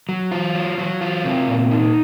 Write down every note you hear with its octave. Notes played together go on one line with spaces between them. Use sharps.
F#3
F4
F#3
F#3
F4
C3
A#2
D#4